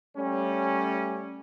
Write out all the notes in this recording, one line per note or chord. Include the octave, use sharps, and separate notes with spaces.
G3 A3 C#4